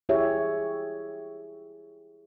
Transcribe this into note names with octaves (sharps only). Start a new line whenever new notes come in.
E4 G4 G#4 C#5 E5